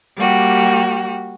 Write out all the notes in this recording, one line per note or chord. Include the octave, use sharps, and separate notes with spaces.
G3 A#3 F#4 G4